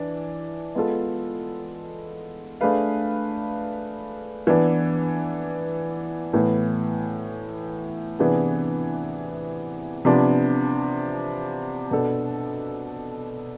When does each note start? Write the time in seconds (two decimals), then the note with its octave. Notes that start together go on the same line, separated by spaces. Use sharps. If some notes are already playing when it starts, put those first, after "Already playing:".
Already playing: E3 D4
0.75 G#3 B3 F4 A4
2.61 A3 D4 G#4 B4 F5
4.47 E3 B3 D4
6.33 A2 E3 B3
8.19 C3 E3 B3 D4 G#4
10.05 C3 F3 B3 D4
11.91 B2 B3 D4 A4